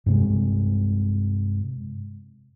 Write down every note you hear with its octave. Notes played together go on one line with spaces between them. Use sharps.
G2 C3 G#3